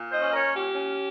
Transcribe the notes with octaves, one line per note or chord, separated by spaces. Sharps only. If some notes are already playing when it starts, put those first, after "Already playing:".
Already playing: A#2
C5 D#5
C#4
A#4 C#5
A#2
G4
C#4